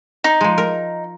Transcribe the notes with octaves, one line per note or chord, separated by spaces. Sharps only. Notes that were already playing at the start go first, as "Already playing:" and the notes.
D#4
F3 G#3
A#4